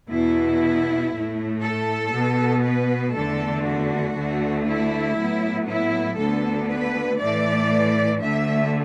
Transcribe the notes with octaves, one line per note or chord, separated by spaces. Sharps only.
E2 B2 B3 E4
A2 A3
A4
B2 B3
B4
E2 D3 A3 A4
F#4
D2 D3 A3
E4
A2 F#3 B3
E4
D2 D3 B3 A4
B4
A2 E3 A3 D5
D2 D3 A3 E5